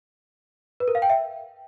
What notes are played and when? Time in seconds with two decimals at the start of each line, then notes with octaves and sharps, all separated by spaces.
0.80 B4
0.88 A#4
0.95 F5
1.02 G5
1.09 E5